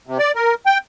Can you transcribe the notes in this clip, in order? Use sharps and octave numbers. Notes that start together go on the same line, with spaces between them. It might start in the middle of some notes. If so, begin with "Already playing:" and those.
C3
D5
A#4
G5